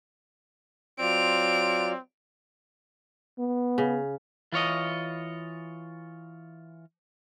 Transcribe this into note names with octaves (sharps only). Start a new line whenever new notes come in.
F#3 C4 F4 D5 D7 F7
B3
C#3
E3 F4 C#5 D#5